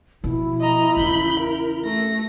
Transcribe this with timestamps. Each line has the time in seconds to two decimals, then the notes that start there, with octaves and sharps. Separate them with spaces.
0.24 B2 F3 E4
0.61 D#5 A#5
0.96 E2 C#3 B5 G6
1.40 A#4
1.85 A3 A#6